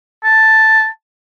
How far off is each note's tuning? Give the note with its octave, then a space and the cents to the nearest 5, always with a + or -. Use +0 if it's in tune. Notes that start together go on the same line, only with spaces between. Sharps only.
A5 +0